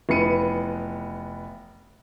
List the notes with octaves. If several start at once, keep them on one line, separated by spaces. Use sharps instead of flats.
F1 E3 B3 C#7 D#7